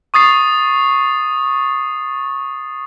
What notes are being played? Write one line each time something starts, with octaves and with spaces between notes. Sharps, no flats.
C#6 D#6 A6 C7